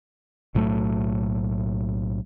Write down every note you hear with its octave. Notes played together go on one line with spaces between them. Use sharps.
B1 A2 F#3 A3